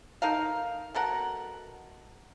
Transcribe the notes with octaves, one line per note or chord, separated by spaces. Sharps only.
D#4 A4 A#4 F5
B2 A4 A#4 F#5